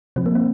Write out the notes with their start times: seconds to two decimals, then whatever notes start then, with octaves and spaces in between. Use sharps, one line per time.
0.16 C3 F3 C4
0.26 A#3
0.35 C4